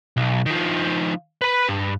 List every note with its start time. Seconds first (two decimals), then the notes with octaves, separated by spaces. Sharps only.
0.17 B1
0.46 D#3 F3
1.42 B4 B5
1.69 G2